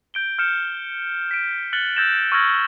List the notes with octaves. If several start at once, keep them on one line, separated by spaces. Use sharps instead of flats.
G6 D7 G7
F6 G6 C#7 E7
B6 D7
F6 F#6 A6 C#7 F#7 G7
E6 F#6 G6 A6 A#6 E7
C#6 E6 F6 G#6 A#6 F#7